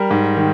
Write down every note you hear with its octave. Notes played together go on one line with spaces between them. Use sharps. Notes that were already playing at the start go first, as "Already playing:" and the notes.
Already playing: G3 A#4
G#2
D#3